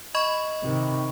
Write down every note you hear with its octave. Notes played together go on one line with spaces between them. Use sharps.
D#5 B5 C#6
C3 D#3